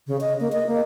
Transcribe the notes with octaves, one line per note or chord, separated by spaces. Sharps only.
C#3
D#5
A#3
D#5
A#3